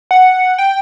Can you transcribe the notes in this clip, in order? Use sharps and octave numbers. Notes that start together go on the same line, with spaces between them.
F#5
G5